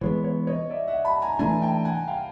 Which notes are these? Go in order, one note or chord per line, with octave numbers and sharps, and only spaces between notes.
E3 G#3 B3 C#5
C#5
C#5 D#5
D5 E5
E5 F#5
A5 B5
G#5 A#5
E3 A3 D4 G#5 A#5
G5 A5
F#5 G#5
F5 G5